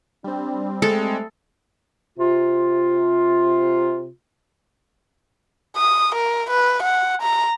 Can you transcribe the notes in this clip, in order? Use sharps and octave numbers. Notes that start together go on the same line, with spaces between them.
G3 C4 D4
G#3 A3 A4
C3 F4
D#6
A#4
B4
F#5
A#5